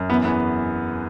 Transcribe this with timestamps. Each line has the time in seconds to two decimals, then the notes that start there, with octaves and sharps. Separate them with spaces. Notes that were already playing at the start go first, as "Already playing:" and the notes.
Already playing: F#2
0.09 E3 B3
0.25 E2 B3